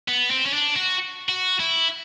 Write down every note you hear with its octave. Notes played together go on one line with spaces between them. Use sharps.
B3
C4
C#4
D4
F#4
F#4
E4